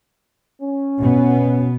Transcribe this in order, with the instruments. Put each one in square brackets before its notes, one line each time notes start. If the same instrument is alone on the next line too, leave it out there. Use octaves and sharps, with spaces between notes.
[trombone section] C#4
[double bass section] B2 B3